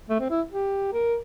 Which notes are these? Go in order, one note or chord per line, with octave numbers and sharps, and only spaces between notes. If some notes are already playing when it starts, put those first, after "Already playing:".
A3
C4
E4
G4
A#4